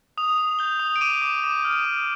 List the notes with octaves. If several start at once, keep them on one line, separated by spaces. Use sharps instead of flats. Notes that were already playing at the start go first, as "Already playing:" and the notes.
D#6 F7
D#6 F7
G6 G7
D#6 F7
D7
D6 D#7
D6
D6
F6
D#6